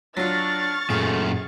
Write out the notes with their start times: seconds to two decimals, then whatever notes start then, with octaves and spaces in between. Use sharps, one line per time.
0.17 F#3 D4 F4 C#6 F6 A6
0.90 F#2 A#2 A3 G#4